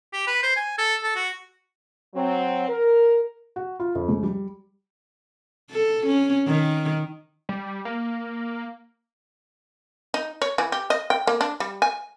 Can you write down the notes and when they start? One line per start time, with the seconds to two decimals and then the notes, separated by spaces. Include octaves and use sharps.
0.13 G4
0.27 B4
0.43 C5
0.56 G#5
0.78 A4
1.03 A4
1.16 F#4
2.15 F#3 C4
2.69 A#4
3.56 F#4
3.80 F4
3.95 F2
4.08 C#2
4.23 G3
5.71 A4
6.06 C#4
6.47 D#3
7.49 G3
7.85 A#3
10.14 D#4
10.42 C#5
10.58 E3
10.72 G4
10.90 D#5
11.10 G5
11.27 A#3
11.41 D4
11.60 G3
11.82 G#5